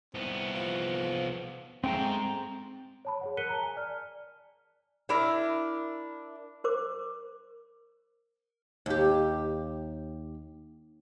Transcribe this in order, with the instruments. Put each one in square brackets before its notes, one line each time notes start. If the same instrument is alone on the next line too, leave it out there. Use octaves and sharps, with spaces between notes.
[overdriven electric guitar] C2 B3 [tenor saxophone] C4
[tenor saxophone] F3
[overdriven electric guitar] G#2 G#3 [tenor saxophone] A3 [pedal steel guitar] C4 G5 A#5
[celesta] C#5 A5 B5
G#4 C#5 F#5
A#4 F#6 B6 C#7 D#7 G7
A5 A#5
G#5
D5 F6
[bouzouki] D4 E4 A#4 E5
[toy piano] A#4 C5 D6
[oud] D#2 G4